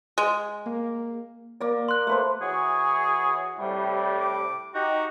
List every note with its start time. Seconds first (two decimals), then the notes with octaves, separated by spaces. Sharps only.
0.18 G#3
0.66 A#3
1.60 A#3 D5
1.88 C6 F#6
2.07 A3 B4 C5
2.41 E3 F#4 G#4 C#5
3.60 A2 C3 G3
4.20 D6
4.75 D#4 F#4 G4